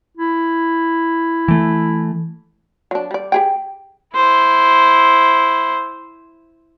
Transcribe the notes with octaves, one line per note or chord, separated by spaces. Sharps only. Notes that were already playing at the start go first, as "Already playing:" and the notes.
E4
E3 A3
F#3 D4
G3 D5
G4 G#4 G5
E4 C5